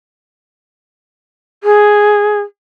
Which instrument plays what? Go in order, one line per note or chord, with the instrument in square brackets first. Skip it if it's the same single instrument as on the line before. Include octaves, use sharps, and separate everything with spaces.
[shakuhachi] G#4